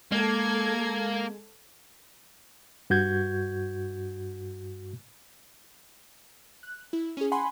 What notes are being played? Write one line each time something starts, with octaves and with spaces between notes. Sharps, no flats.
G#3 A#3 A4 G#6
G2 F#4 G6 G#6
F#6
E4
C#4 G#4
F#5 G#5 B5 C6